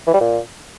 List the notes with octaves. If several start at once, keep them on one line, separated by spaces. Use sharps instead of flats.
E3
G3
A#2